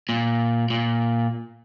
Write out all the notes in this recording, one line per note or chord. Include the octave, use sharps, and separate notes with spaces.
A#2
A#2